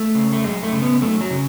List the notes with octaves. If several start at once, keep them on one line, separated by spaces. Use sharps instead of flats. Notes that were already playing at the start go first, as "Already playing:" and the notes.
Already playing: A3
C#3
A3
F#2 G#3
A3
C#3
B3
F#2 A3
F#3
C#3